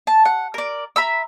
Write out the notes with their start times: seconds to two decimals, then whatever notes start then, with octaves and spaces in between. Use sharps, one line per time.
0.07 A5
0.25 F#5
0.54 A#4 D5
0.96 E5 A#5 B5 E6